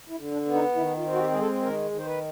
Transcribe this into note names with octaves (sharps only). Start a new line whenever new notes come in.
E4
D3
D4
B3
D#4
D#3 E4
F4
C4
F#4
G4
G#3 G#4
A4
D#3 A#4
D#3
C5
B4